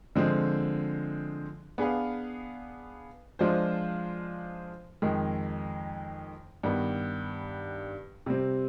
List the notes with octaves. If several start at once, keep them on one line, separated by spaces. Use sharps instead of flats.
D3 F3 G#3 C4
B3 D4 G#4 B4 F5
F3 G#3 D4 F4 C5
F2 D#3 G#3
G2 D#3 B3
C3 G3 C4